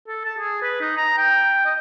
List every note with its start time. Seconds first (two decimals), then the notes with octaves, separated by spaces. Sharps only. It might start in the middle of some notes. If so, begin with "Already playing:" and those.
0.08 A4
0.25 A5
0.39 G#4
0.62 B4
0.81 D#4
0.97 A#5
1.18 G5
1.65 D#5